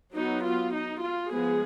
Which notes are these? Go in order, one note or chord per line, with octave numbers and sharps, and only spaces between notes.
F#3 B3 D#4
F4
D#4
F4
F3 G#3 B3 G#4